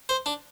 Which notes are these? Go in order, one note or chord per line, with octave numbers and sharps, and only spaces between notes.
C5
D4